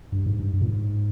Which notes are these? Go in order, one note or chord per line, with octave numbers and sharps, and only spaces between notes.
G2
G#2
G2
G2
A#2
G#2